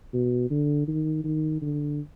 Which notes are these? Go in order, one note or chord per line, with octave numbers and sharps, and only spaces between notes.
B2
D3
D#3
D#3
D3